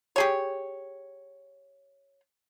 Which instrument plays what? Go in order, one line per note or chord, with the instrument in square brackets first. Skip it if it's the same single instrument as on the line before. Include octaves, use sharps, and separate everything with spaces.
[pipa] G4 G#4 C#5